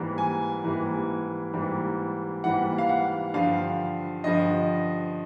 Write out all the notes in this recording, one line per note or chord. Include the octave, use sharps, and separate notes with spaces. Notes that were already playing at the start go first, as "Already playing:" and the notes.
Already playing: G#2 E3 G3 A#3
G#5
G#2 E3 G3 A#3
G#2 E3 G3 A#3
G#2 E3 G3 A#3 F#5
F5
F#5
G2 D3 F3 F5
G2 D3 F3 D#5